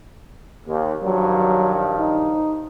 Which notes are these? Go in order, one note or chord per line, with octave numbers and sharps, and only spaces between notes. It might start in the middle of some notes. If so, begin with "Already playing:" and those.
D#2
G2 D#3 F3 F#3
D#4